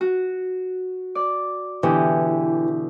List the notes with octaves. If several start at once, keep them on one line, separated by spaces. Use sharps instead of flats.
F#4
D5
B2 D3 E3 G4